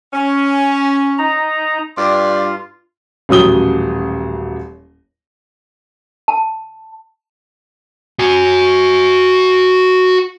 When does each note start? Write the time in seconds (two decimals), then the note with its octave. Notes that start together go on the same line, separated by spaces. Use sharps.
0.14 C#4
1.18 D#4 A#5
1.97 G2 F4 D5
3.29 D#1 A1 F#3 D#6 G7
6.28 A5
8.19 F#4 G#5